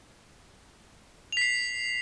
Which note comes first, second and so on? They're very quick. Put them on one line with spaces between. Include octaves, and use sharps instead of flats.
F7 B6 C7